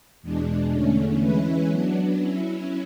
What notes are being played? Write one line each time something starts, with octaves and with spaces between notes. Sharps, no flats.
E2 B2 G#3 D4
E2 D3 A3 C#4
E3 G#3 C#4 E4 B4
F#3 B3 D4
F#3 C#4 E4